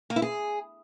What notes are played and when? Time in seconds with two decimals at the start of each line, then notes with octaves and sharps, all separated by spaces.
0.10 A#3
0.16 E4
0.22 G#4